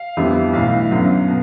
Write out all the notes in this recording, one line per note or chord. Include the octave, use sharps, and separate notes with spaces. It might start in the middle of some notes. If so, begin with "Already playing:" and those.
Already playing: F5
F2 D3 G3 B3 E4
B1 A2 E3 F5
F#2 D3 F#3 B3
B2